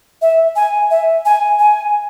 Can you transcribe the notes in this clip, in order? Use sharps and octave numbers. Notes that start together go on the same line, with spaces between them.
E5
G#5
E5
G#5
G#5